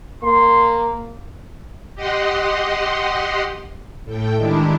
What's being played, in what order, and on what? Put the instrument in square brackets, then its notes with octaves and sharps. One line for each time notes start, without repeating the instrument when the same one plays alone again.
[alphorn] A#3 [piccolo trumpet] C6
[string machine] G4 D#5 F#5 C6
A2 A3 G5
D#3 G#3 D4 E4 G4